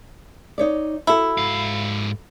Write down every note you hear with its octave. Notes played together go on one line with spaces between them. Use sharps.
D#4 C#5 D5
E4 F#4 A4
G#2 F5